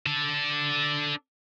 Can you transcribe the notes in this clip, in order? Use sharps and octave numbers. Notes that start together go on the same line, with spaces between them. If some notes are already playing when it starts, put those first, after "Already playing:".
D4 A4